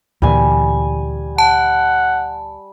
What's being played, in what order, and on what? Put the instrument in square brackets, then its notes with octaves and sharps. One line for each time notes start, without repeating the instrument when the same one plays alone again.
[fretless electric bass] D2 A#2 E3 [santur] G3 G#5
[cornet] F#5 [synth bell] A5